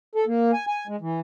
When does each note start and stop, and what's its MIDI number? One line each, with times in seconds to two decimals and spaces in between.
0.15 0.25 69
0.27 0.51 58
0.53 0.66 80
0.67 0.87 80
0.87 0.96 56
1.01 1.20 52